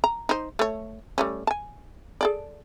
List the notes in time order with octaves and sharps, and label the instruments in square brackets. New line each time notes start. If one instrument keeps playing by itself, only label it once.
[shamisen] A#5
D#4 C5
A3 C#5
G3 A3 C#4
G#5 A5
G#4 A4 D5